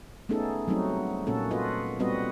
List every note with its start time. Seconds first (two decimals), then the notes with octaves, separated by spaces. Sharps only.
0.29 A3 B3 C#4 D#4 G#4 A4
0.67 F#3 G3 A3 C4 D#4 F#4
1.27 A#2 A#3 C#4 F#4 A4
1.51 F4 F#4 B4 D#5
1.99 G3 B3 C4 F#4 B4 D#5